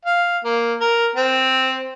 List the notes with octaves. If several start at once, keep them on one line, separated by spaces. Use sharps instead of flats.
F5
A#3
A#4
C4